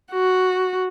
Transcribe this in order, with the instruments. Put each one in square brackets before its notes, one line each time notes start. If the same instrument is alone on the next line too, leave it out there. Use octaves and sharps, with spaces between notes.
[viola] F#4